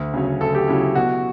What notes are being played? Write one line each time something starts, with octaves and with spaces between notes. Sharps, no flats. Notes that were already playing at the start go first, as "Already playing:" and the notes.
Already playing: D2
C#3 F#3 C#4
D2 A4
G4
C#3 F#3 C#4 E4
B2 F#4